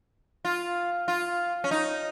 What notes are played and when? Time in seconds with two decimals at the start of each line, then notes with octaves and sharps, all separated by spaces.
0.45 F4
1.08 F4
1.64 C#4
1.71 D#4